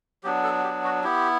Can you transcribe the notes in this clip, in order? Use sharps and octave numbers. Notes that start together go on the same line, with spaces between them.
F#3 B3 D4 G4
A4
G4
F#4
B3 E4 G4